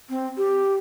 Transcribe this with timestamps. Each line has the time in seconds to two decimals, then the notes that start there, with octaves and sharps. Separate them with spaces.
0.10 C4
0.37 G4